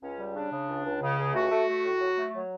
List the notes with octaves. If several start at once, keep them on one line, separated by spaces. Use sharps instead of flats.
C#2 C#4
G3
C#3 D4
C#3
C#2
C#2
C#3
C#2
A3 F#4
A3
A3
A2
F#3
A3
F#3